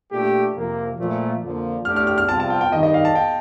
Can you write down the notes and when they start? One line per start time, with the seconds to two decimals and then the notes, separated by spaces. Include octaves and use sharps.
0.11 A#2 A3 D4 G4
0.55 F2 C3 F3 A#3
0.98 A#2 F3 A3
1.41 F2 D3 F3 A#3
1.85 A2 A3 D4 G4 F6
1.96 F6
2.07 F6
2.18 F6
2.28 C3 G3 C4 F4 A5
2.40 A5
2.50 G5
2.61 G5
2.72 G2 D#3 G3 D#5
2.83 D#5
2.94 F5
3.05 A5
3.15 G5